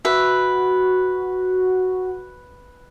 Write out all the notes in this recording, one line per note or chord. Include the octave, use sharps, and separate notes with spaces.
F#4 B4 E5